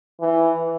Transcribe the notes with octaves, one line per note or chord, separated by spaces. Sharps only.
E3